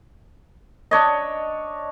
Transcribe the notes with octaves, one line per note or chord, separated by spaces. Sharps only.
D4 C#5 D#5